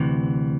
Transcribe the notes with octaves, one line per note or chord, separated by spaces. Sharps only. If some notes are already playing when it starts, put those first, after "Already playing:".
Already playing: D2 C3 E3